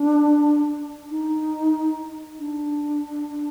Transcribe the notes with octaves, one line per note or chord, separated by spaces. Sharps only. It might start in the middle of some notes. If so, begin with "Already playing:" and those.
Already playing: D4
D#4
D4